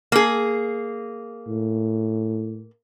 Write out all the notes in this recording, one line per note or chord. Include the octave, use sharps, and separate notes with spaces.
A#3 G#4
A2